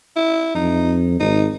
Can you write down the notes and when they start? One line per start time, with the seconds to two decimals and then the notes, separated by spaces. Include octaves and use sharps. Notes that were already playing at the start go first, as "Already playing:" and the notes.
0.16 E4
0.55 F2 D#4
1.20 G#1 D#4